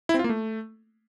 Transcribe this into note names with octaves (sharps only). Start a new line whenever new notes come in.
E4
C4
F4
A#3
A3